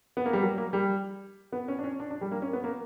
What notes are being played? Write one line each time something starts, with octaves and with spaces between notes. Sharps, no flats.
B3
A#3
G3
F#3
A#3
G3
B3
C#4
D4
C#4
D4
D4
G3
A#3
C#4
B3
A#3